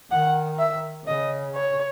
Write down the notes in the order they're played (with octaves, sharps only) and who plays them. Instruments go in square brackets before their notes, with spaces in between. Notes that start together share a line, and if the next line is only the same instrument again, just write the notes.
[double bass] D#3 [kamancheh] F#5
[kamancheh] E5
[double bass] C#3 [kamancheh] D#5
[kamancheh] C#5